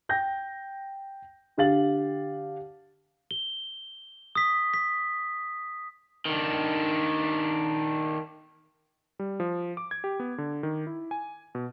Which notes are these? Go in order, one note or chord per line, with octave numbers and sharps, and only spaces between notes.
G5 G6 A#6
D3 G4 F5 A6 F#7
G7
D#6 B6
B6
D#3 D4
G3
F3
D6
G#6
G4
B3
D3
D#3
E4
G#5
B2